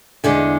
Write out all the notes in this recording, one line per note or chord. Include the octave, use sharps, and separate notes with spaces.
E2 D3 G#3